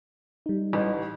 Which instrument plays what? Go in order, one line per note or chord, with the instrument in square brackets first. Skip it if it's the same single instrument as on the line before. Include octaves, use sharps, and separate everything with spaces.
[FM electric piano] G3 D#4
[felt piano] A1